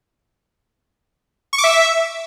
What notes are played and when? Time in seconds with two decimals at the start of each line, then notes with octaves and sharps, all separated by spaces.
1.53 C#6
1.58 D6
1.64 E5